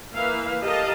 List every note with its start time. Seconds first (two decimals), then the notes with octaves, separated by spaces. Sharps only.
0.15 E3 A#3 B4 E5 F5
0.62 G4 A4 A#4 D#5 F5 A5